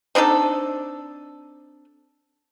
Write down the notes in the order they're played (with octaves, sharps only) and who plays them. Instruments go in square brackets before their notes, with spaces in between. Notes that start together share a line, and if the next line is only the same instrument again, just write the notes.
[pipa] C4 D4 D#4 A4